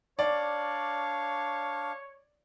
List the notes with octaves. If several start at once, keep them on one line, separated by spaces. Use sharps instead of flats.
D4 C#5 D5 F5